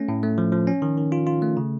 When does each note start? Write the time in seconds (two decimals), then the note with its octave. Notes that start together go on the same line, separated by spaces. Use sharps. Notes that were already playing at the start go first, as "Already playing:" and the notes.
Already playing: A3 C#4
0.08 A2
0.23 A3
0.38 F3
0.52 F3
0.67 C#4
0.82 D#3
0.97 D#3
1.12 F4
1.27 F4
1.42 A3
1.57 C#3